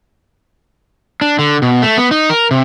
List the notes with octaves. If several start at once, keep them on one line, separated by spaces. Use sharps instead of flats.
D4
D3
B2
A3
B3
D#4
A#4
C3